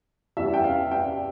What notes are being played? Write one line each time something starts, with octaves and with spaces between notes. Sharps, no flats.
E2 E3 G3 E5
G5
F5
G5